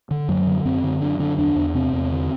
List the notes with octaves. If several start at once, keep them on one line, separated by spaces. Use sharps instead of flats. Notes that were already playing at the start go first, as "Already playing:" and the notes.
D3
F#2 F#3
D3
F#2 C4
D3
F#2 D4
D3 D4
E2 D4
E2
C3 C4
E2
D3